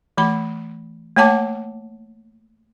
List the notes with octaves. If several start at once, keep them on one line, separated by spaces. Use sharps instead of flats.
E3 A3 B5
A3 A#3 C#5 F#5 A5 D6